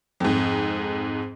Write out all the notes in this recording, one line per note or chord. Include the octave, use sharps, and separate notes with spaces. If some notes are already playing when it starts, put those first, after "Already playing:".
F2 G#2